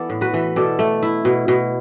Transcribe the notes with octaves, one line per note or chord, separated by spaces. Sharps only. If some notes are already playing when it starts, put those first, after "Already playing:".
Already playing: E3 B3 A4 D5
A2
F#4 B4
E3
B2 A4 D5
A3
E4
B2
B2